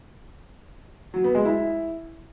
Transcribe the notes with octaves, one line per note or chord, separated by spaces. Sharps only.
F#3
B3
G#3
E4